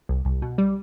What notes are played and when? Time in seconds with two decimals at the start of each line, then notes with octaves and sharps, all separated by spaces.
0.09 C2
0.25 C2
0.42 B2
0.58 G3